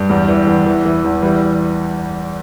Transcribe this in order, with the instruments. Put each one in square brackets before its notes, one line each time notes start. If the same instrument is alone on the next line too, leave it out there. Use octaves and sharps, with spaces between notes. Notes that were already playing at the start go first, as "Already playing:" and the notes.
Already playing: [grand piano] G2
E2 G3
E3
E2
E3
E3
E2
E3 G3